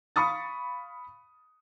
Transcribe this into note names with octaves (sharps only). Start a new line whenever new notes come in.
F5 B5 C#6 D#6 A6